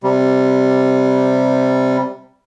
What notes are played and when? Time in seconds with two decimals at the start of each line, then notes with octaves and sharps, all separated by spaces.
0.03 C3 G3